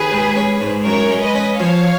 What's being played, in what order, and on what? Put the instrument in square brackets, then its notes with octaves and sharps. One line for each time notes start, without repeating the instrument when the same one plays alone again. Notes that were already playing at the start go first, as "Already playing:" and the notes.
Already playing: [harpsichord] D#2 [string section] G#4 B4
[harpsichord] G#2
C#4
G#2
[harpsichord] F#2 [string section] A#4 C#5
[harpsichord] G#3
[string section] B4 D#5
[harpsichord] C#4
[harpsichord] F3 [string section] C#5 F5